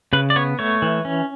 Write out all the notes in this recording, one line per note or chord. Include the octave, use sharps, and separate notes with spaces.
C#3 B4
D5
B3 C#5
A3 C#5
E3
C#4